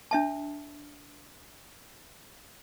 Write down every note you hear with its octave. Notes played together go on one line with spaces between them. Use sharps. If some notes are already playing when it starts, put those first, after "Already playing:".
D4 E5 A5